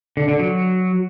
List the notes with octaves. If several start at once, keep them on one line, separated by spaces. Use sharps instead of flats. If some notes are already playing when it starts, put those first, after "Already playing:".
D3
D3
F#3